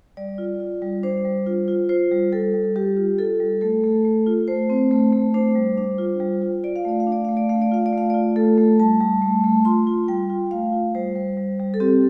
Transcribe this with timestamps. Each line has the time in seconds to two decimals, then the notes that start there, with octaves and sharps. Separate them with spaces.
0.17 G3 D5
0.38 F4
0.60 F4
0.82 G3
1.03 D4 C5
1.25 G3
1.46 F4
1.68 F4
1.89 F4 C5
2.11 G3
2.32 G3 A4
2.54 G3
2.76 G3 G4
2.97 F4
3.18 F4 A4
3.40 G3
3.61 A3 A4
3.84 A3
4.05 A3
4.26 F4
4.48 A3 C5
4.70 C4
4.91 A3
5.12 A3
5.34 D4 C5
5.55 G3
5.77 D4
5.98 F4
6.20 G3
6.42 F4
6.64 F4 D5
6.76 F5
6.85 A3 D5
7.00 F5
7.07 D4
7.12 D5
7.25 A3 F5
7.37 D5
7.49 A3 F5
7.62 D5
7.71 F4 F5
7.86 D5
7.92 A3
7.98 F5
8.10 F4 D5
8.36 A3 A4
8.58 A3
8.79 G3 A5
9.00 G3
9.22 A3
9.44 A3
9.65 F4 C6
9.87 F4
10.08 G3 G5
10.30 F4
10.51 A3 F5
10.72 F4
10.95 G3 C5
11.15 G3
11.37 G3
11.60 G3
11.74 A4
11.80 C4 G4